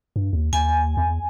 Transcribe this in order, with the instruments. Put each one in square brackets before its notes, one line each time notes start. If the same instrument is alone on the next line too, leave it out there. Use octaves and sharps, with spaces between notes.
[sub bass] G2
D#2
[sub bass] D#2 [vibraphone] G#5
[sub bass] E2